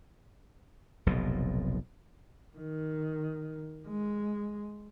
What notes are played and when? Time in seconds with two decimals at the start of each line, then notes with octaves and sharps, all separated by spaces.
1.06 F1 B1 F2 A#2
2.57 D#3
3.88 G#3